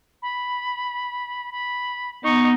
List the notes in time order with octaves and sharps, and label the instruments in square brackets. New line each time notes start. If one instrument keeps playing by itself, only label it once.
[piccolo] B5
B5
[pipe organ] B3 [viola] D#4 [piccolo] C#6